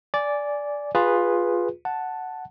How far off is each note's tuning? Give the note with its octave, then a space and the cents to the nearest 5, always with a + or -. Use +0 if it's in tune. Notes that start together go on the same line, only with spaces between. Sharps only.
D5 -10 G#5 +0
F4 +10 G#4 -15 B4 +0
F#5 +0 A5 +0